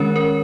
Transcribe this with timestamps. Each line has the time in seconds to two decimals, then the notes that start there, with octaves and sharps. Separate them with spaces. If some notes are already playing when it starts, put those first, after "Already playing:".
Already playing: D#3 G#3 C#4 A#4 C#5
0.16 A#4